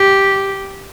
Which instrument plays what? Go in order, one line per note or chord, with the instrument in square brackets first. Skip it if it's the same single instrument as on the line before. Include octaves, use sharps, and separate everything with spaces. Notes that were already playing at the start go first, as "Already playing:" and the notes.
Already playing: [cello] G4